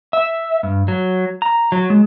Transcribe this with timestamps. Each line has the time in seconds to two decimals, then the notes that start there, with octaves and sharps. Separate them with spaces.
0.13 E5
0.63 G2
0.88 F#3
1.42 A#5
1.72 F#3
1.90 G#3